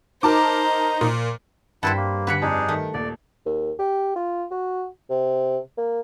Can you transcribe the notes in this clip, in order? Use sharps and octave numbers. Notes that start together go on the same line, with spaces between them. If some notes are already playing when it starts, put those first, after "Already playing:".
D#4 A#4 C5 A5 A#5 D6
A#2
G2 E4 B4 C5 F#5 A5
A#3
D3 B4 C#5 B5 F#6 C#7
F2 D4 D#4 G#4
D#3 A3
D#1 D5
D#2
G4
F4
F#4
C3
A#3